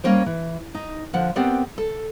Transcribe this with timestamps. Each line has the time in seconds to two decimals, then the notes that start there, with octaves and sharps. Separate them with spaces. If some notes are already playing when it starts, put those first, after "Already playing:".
0.04 G3 A#3 C#4 A#4 C5
0.26 E3
0.75 D#4
1.13 D3 F3 F#5
1.36 B3 C4 G4 A#4 D5 F#5
1.78 A4